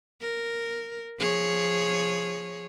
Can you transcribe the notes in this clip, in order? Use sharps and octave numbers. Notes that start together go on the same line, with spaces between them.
A#4
F3 G#4 C#5